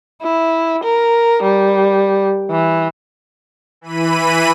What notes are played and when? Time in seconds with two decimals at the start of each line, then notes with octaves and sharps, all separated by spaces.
0.23 E4
0.84 A#4
1.43 G3
2.50 E3
3.81 E3 B5 D#7